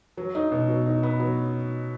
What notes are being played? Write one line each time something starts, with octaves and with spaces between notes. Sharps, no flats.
F#3
D#4
B2
F#3
D#4
B3
F#3